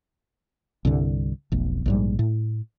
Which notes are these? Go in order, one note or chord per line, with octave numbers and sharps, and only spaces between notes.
C2 G2 D3
F1 B1
A#1 G#2 G3
A2